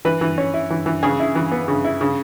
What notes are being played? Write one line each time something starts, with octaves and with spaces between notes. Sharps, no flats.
E3 B4
E3
C#4
E4
E3
E3
C#3 G#4
E4
E3
B3
C#3
E4
C#3